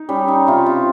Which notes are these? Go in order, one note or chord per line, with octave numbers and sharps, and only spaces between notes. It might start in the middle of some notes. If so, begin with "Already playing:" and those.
Already playing: D#4
G3 C#4
D#4
C3 F4
F4